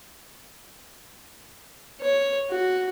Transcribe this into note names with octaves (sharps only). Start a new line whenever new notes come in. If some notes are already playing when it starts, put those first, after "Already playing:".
C#5
F#4